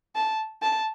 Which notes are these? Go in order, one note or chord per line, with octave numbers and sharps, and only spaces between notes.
A5
A5